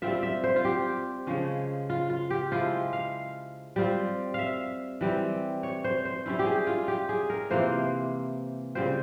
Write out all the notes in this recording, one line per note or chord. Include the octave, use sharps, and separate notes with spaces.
G3 C4 F4 E5
E5
C5
F4
G4
C#3 F3 G#3 C#4
F4
F4
G4
F3 G#3 E4 F4
F5
G3 C4 F4
E5 F5
E3 G3 C4
C#5
C5
C5
G3 C#4 E4
G4
G#4
F4
G4
G#4
A#4
C3 E3 A#3 F4 C5
C#3 G3 C4 F4 C5